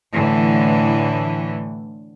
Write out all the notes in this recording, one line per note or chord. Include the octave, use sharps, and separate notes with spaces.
A2 D3 E3